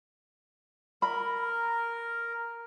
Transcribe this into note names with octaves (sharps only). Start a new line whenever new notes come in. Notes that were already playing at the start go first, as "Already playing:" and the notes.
A#4 B5